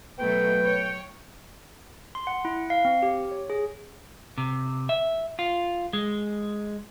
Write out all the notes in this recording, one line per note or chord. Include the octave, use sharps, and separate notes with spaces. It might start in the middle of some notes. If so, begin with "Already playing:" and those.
B2 F#3 A3 B4 G5
C#5
C6
F#5
E4
F5
C4
G4
C#5
G#4
C3
E5
F4
G#3